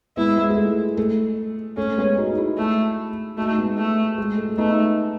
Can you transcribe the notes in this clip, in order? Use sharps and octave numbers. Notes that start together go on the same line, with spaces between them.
G#3 B3 E4
G#3
G#3
A3
A3
A3 C#4
G#3 B3
D#4 F#4
E4 G#4
A3
A3 D#4 F#4
G#3 B3
A3
G#3
A3
A3 B3 D#4